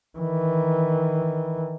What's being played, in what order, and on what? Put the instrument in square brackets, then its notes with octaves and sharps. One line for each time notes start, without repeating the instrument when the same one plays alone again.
[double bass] D#3 E3